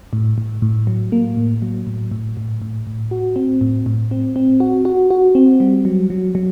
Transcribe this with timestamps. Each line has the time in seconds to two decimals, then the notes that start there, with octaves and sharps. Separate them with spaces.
0.13 A2
0.38 A2
0.62 A2
0.87 F#3
1.12 A#3
1.37 A2
1.62 F#3
1.87 A2
2.12 A2
2.37 A2
2.62 A2
2.87 A2
3.11 F#4
3.36 C4
3.61 A2
3.86 A2
4.11 C4
4.36 C4
4.60 F#4
4.85 F#4
5.10 F#4
5.35 C4
5.60 G3
5.85 F#3
6.10 F#3
6.35 F#3